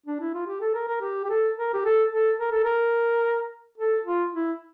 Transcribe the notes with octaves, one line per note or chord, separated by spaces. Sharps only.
D4
E4
F4
G4
A4
A#4
A#4
G4
G4
A4
A#4
G4
A4
A4
A#4
A4
A#4
A4
F4
E4